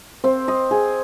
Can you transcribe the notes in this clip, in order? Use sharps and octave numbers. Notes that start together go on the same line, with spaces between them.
C4
D#5
G#4